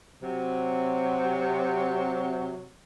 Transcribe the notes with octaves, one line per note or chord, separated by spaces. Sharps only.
C3 F#3